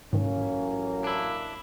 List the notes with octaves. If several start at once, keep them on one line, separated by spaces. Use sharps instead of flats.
A1 G#2 D#3 F#3 A#3 C#4
D4 E4